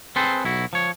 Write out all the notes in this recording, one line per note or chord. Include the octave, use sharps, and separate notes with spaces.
C4 G#4 A4 B4 C5
B1 E4 F#4
F3 C#5